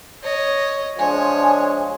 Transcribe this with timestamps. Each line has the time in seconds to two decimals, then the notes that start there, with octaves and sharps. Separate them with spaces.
0.23 C#5 D#5
0.99 F3 G#3 D4 C#5 G#5